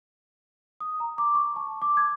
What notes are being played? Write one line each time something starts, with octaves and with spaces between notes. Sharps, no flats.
D#6
A#5
D6
C#6
A5
D6
G#6